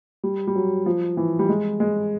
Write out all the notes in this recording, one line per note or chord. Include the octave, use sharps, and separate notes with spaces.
G3
G3
F#3
F3
E3
G3
G#3
G#3